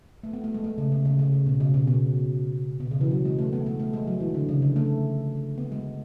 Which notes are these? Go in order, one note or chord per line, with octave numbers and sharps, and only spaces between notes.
A3
B3
A3
G#3
A3
C#3
C#3
C#3
C#3
C#3
B2
C#3
B2
B2
B2
C#3
E3
F#3
G#3
A3
B3
A3
A3
G#3
F#3
E3
D3
C#3
D3
A3
B3
G#3